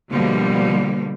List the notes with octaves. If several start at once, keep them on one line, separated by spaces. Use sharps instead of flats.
B2 D3 F3 G3 A#3